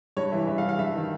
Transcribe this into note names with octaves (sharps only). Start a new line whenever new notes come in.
G2 C#5
E3 E5
G2 E5
F5
E3
F5
G2 E5
D#3